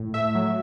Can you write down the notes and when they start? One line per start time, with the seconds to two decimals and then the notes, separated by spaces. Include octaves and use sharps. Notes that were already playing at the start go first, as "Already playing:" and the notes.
Already playing: A2
0.14 A3 E5
0.35 F#3